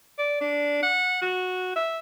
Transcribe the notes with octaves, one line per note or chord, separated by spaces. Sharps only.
D5
D4
F#5
F#4
E5